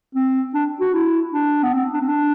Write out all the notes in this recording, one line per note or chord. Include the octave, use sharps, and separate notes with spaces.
C4
D4
F#4
E4
D4
B3
C4
D4
C4
D4